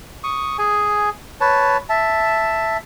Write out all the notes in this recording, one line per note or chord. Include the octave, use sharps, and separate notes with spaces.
C#6 D#6
G#4 G#5
B4 C#5 A5
E5 A5